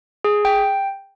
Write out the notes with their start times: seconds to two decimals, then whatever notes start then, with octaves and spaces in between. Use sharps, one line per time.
0.24 G#4
0.45 G5